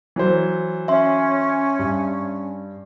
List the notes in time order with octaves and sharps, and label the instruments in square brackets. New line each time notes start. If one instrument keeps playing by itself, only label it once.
[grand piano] E3 F#3 C5
[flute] C#4 [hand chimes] E5 C6
[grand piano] G2